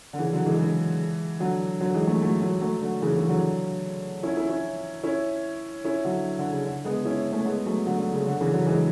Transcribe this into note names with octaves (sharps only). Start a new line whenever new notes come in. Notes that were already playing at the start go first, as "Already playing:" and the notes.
D3
C#3 E3
D3 F#3
E3 G#3
E3 G#3
D3 F#3
D3 F#3
E3 G#3
F#3 A3
F#3 A3
F#3 A3
F#3 A3
D3 F#3
C#3 E3
C#3 E3
D3 F#3
C#4 E4
C#4 E4
C#4 E4
C#4 E4
C#4 E4
D3 F#3
D3
C#3
D3
G#3 B3
C#4 E4
A3 C#4
G#3 B3
F#3 A3
D3 F#3
D3
C#3
D3
C#3 E3
D3 F#3
E3 G#3